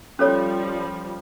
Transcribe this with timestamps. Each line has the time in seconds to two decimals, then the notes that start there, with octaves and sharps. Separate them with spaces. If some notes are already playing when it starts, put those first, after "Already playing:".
0.19 F3 G3 C#4 A4 C#5